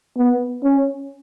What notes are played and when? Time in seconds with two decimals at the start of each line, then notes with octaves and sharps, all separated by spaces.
0.17 B3
0.64 C#4